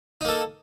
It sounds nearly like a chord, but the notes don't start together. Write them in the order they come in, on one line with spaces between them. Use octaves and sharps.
D#4 A#3 A4